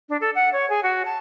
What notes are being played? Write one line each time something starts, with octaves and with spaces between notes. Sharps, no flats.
D4
A4
F#5
C#5
G#4
F#4
A5